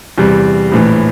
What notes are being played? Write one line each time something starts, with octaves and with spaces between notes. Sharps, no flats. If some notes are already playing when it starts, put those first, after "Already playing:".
E2 C3 G3
A#1 A2 E3